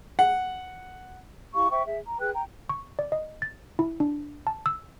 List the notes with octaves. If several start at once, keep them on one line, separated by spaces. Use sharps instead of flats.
F#5
E4 G4 F5 C#6
C5 E5 G5 C#6
G#4 E5
A#5
G#4 B4 G5 F#6
G5 A#5
C#6
D5
D#5
A6
E4
D4
A5
E6